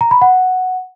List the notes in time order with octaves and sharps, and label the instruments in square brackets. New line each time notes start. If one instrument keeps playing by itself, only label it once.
[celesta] A#5
B5
F#5